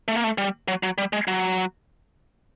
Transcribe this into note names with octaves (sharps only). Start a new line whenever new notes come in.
A3
A#3
A3
G3
F#3
F#3
G3
G#3
F#3